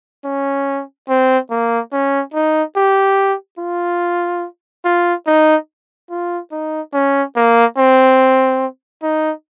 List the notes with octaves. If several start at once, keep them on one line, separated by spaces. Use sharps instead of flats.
C#4
C4
A#3
C#4
D#4
G4
F4
F4
D#4
F4
D#4
C#4
A#3
C4
D#4